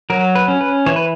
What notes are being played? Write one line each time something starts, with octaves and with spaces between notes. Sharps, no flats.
F#3 A#4
B4
C#4
B4
E3 C#5
B4